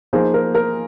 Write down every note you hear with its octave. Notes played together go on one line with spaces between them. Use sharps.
F3 A#3 D#4 G#4 C5
A#4
A#4